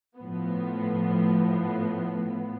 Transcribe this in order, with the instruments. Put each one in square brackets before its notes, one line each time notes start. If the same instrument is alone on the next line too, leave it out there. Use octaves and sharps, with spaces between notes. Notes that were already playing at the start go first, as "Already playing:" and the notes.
[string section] A2 F3 B3